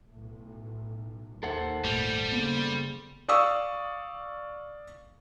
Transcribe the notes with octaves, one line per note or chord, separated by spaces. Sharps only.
B1 A2
D#2 A4 C5 F#5
G#1 A#2 G3 A3
F#1 C#3 A#3 B3
D5 F5 C#6 D#6 E6